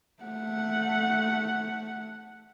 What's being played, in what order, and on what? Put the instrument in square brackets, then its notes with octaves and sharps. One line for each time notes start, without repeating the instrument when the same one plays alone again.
[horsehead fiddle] A3 F#5